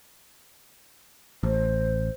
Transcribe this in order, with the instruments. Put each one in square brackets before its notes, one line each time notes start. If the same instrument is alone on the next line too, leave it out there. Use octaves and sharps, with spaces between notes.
[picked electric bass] A1 [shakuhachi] C5